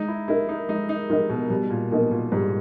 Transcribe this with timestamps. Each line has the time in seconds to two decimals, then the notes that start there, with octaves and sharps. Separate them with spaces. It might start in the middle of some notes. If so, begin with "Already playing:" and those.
Already playing: G#3 D#4
0.08 E4
0.28 D#4 E4 A#4 D#5
0.49 D#4
0.69 G#3 D#4
0.89 D#4
1.10 G#3 D#4 A#4 D#5
1.30 B2
1.50 B2 G3
1.70 A#2
1.91 B2 A#3 D#4 A#4 D#5
2.11 A#2
2.32 G#2 G3